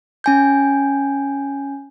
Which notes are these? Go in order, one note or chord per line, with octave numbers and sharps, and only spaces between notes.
C#4 G#5 G6